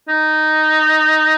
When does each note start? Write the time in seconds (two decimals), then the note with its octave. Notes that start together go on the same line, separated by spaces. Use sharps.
0.08 D#4